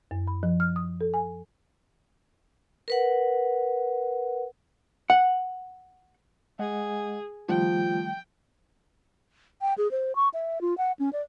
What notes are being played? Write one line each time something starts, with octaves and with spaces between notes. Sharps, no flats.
F#2
B5
F3
F6
D#6
A4
G#5
A#4 B4 F#5
F#5
G#3 G#4 D#5 F#5
D#3 F3 G3 A3 G5
G5
G#4
C5
C#6
E5
F4
F#5
C#4
D5